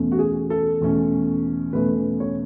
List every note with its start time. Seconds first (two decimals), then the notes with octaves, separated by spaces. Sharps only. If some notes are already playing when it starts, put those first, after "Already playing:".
Already playing: E2 B2 A3 C#4
0.12 F#4
0.19 G#4
0.50 A4
0.81 E2 B2 A3 C#4
1.73 E2 B2 A3 C#4 B4
2.20 C#5